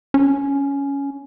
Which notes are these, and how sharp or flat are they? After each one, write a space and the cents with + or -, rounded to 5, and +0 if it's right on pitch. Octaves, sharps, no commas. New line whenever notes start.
C#4 +10